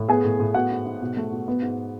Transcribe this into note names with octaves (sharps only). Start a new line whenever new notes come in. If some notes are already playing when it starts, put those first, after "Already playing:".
Already playing: A2
B3 G#4 G#5
A2
A2
B3 F#4 F#5
G#2
G#2
B2
A3
B2
B3
G#2